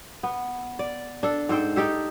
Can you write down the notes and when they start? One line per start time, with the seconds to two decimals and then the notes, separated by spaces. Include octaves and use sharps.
0.23 B3
0.79 D5
1.23 D4 A4
1.49 G#2 A4 C5 G5
1.76 D#4 G4 A4